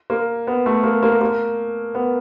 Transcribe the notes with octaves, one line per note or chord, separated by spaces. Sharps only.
A#3
B3
A3
A#3
A#3
A#3
B3